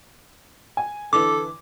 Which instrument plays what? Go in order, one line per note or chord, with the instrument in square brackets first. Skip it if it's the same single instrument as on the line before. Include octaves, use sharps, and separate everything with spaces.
[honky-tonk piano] G#5
[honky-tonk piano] D3 E3 [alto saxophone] A4 [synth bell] D6